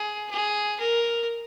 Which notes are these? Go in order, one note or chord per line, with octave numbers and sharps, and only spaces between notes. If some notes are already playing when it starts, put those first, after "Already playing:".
Already playing: G#4
G#4
A#4